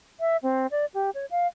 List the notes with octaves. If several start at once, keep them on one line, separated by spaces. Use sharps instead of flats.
E5
C4
D5
G4
C#5
F5